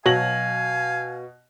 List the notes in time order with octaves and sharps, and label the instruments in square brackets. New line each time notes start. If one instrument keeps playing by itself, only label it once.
[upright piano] B2 A#6 F#7 [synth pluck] F#3 [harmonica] F5 [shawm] G#5